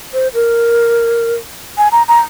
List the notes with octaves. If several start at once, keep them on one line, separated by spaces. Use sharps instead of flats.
C5
A#4
G#5
A#5
A#5